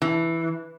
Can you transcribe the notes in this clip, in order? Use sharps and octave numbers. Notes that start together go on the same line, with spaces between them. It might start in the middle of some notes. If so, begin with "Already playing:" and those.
E3